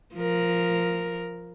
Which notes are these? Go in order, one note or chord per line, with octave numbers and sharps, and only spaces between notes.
F3 A#4